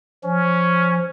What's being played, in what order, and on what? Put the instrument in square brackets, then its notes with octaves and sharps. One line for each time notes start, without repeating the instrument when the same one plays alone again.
[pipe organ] F3 [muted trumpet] C#4